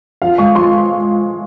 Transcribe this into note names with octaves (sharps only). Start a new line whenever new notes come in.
F3 F5
G#3 C#6
F3 C6